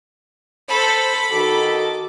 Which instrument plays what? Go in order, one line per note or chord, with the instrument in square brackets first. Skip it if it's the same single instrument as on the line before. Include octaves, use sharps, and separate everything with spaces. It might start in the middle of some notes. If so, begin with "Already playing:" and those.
[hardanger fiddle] A4 [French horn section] C5 [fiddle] B5
[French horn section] D#3 F#4 [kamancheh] A4 [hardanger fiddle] D6